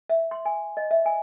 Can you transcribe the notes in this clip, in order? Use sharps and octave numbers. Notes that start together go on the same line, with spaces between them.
E5
C6
G#5
D#5
E5
G#5